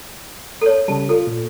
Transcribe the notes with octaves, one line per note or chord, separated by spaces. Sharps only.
A4 C#5
C#3 G3 A5
F4 A4
A#2